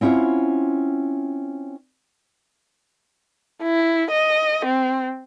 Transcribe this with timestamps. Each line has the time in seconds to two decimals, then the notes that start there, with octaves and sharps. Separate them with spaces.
0.01 C4 C#4 E4 F4 F#5
3.62 E4
4.11 D#5
4.65 C4